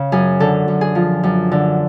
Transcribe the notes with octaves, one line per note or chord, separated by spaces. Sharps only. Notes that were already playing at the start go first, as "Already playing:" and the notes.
Already playing: C#3
F#2 G#4
D3 A4
F#2
G#4
F3
F#2
D3